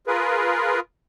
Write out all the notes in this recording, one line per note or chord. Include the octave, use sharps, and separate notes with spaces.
F4 G#4 A#4 B4